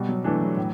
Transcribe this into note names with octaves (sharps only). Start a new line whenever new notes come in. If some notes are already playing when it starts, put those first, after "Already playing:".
Already playing: B2 G3
F#3
E3 A3 D4
F#3
A2